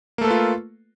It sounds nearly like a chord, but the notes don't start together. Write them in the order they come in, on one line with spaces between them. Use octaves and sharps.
A#3 A3 A4 B4 F4